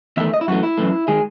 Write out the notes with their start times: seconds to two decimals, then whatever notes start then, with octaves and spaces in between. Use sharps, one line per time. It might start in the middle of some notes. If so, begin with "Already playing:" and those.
0.17 E2 D#3 A3 E5
0.34 D#5
0.41 E4
0.48 F#2 E3 A3 F#4
0.63 E4
0.78 F#2 E3 A3
1.08 D#3 G#3 G#4